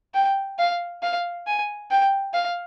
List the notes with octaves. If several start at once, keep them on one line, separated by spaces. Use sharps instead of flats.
G5
F5
F5
G#5
G5
F5